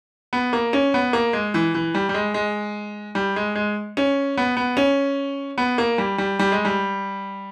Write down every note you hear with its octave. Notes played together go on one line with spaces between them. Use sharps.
B3
A#3
C#4
B3
A#3
G#3
E3
E3
G3
G3
G#3
G#3
G3
G#3
G#3
C#4
B3
B3
C#4
B3
A#3
G3
G3
G3
G#3
G3